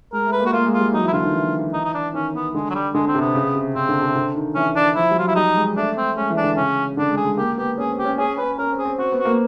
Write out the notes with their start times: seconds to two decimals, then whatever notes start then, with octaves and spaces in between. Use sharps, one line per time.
0.13 G#3 A#4
0.26 A3
0.32 B4
0.40 A#3
0.46 F#4
0.53 A#3 F4
0.66 G#3
0.74 F4
0.80 G3
0.93 F#3 D#4
1.03 E3
1.08 E4
1.13 D3 F4
1.23 D#3
1.33 E3
1.73 D#4
1.85 D#4
1.94 D4
2.14 D#3 C#4
2.34 B3
2.54 D3 G#3
2.70 F#3
2.75 G3
2.94 D3 G#3
3.07 C4
3.15 C3
3.21 B3
3.35 C#3
3.55 C3
3.75 C#3 C4
3.89 D3
4.02 C3
4.16 D3
4.35 D#3
4.55 E3 C#4
4.76 D4
4.96 F3 E4
5.11 G3
5.16 F#3 F4
5.28 E4
5.36 G3 D#4
5.56 G#3
5.76 A3 D4
5.97 C4
6.16 G#3 C#4
6.30 E3
6.37 D4
6.44 D3
6.57 C#3 C#4
6.97 D3 D4
7.11 G#3
7.17 G#4
7.24 G#3
7.37 A#3 G4
7.58 B3 G4
7.78 C#4 G#4
7.91 C4
7.99 G4
8.05 C#4
8.18 C#4 G#4
8.38 C#4 B4
8.58 C#4 A#4
8.72 C4
8.78 G#4
8.85 C4
8.98 C4 F#4
9.12 B3
9.19 F#4
9.25 A#3